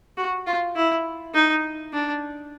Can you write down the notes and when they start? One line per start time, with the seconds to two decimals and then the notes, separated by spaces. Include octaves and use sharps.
0.17 F#4
0.47 F4
0.76 E4
1.34 D#4
1.93 D4